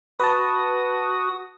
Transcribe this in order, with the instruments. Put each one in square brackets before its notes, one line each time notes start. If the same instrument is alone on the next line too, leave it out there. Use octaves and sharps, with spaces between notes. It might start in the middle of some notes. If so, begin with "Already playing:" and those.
[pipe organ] F#4 D#6 [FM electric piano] B4 A5